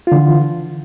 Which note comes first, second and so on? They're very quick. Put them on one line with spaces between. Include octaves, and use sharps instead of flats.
F4 D3 E3